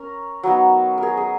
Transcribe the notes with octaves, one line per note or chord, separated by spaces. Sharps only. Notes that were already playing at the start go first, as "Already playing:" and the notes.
Already playing: C#4 A#4
F#3 B3 D#4
G#4 A#4
G#4